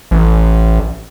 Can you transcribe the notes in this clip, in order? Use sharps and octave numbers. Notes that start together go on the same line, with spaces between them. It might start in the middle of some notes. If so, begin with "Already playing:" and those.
A1